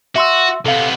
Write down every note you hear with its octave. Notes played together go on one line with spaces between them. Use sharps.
F#4 E5 C6 E6
C3 B3 A4 F5